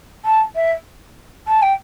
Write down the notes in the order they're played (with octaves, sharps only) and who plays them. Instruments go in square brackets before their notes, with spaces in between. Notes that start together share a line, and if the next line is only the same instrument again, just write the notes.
[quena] A5
E5
A5
G5